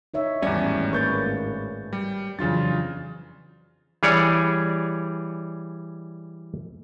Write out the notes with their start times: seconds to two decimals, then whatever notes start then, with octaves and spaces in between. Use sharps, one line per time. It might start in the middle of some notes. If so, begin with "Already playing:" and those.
0.14 D#4 C#5 E5
0.42 G#1 E2 A2 G3 C#4 D5
0.93 A#3 B4 C#6 G6 A6
1.93 G3
2.39 F2 C#3 E3 F#3 D4 F4 A6
4.03 E3 G3 G#4 C#5 D5